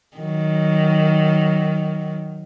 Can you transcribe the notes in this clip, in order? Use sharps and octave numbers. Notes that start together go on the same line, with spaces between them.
D#3 F#3